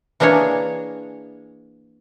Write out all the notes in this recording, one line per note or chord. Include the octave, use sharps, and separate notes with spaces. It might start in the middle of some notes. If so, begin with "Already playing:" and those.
E3 A#3 D4 G#4 C#5